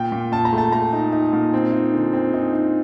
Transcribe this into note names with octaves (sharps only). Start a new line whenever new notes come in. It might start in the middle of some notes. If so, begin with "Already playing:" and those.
Already playing: A#2 G5
A#2
A#2 A5
A#5
A3
A5
A3 A#5
D#4
D#4
A#2
C4
D#4
D3
C4
D#4
D#4